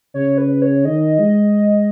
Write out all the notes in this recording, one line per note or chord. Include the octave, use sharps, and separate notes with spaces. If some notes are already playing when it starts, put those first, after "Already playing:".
C#3 C#5
B4
C#5
D#3 D#5
G#3